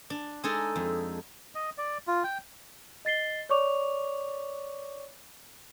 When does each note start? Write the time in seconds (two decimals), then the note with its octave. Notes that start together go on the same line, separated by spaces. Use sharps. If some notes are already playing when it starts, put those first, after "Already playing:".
0.10 D4
0.43 G#3 D4 D#4 G#4 A4
0.76 F2
1.55 D#5
1.78 D5
2.07 F4
2.24 G5
3.05 D#5 A6 C7 G7
3.49 C#5 D5 C#6 D6 F7